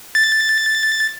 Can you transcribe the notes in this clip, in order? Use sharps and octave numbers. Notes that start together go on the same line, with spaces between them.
A6